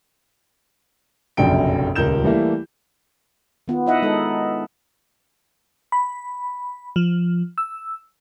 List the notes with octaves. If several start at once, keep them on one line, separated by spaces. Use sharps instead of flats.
F1 A#1 F#2 C#3 G5 D7
D#1 C#2 A#4 G6 E7
E3 G3 A3 A#3 E4
D#3 B3 F4
D#4 E4 D#5 E5 F#5
G#3 D#4 A4
B5
F3
E6